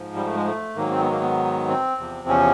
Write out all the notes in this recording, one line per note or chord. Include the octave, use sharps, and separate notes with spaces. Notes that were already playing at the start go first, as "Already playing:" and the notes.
Already playing: G#2 F3
G3
A3
G#3
A3
G#2 D#3 F#3 A#3
C4
B3
A#3
B3
C4
E2 C3 F3
C#4